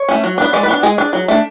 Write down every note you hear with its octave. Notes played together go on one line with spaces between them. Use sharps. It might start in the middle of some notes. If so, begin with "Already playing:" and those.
Already playing: C#5
A3 C#4
F#3
B3 D4
G#3 D5
B4
B3 D4
G#3 G#4
D4
F#3
A3 D4